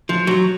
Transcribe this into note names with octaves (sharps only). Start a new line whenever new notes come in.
F3
F#3